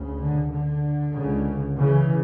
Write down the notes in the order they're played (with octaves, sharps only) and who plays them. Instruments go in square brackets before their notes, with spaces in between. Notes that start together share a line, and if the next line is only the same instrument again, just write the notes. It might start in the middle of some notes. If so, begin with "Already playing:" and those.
Already playing: [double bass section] D2 C#3
D3
D3
C#3
C#2
C#3 E3